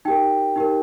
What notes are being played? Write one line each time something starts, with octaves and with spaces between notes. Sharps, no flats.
D#4 G4 A#4 G5
D#4 G4 A#4